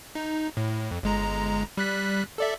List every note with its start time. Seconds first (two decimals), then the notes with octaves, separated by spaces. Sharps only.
0.15 D#4
0.57 A2
0.91 F2
1.03 G1 G#3 A#5
1.77 G3 F#6 B6
2.38 A4 D5 E5